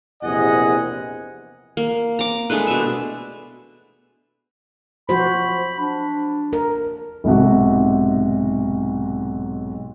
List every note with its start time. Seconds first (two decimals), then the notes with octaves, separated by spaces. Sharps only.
0.23 A#1 E2 C3 D#5 F#5 G#5
1.77 A#3
2.19 A#5 D6
2.50 G#3 A3 D4 B4
2.67 B2 E5
5.09 F3 F#4 C5 B5
5.80 D4
6.53 A#4
7.24 B1 G#2 C3 F#4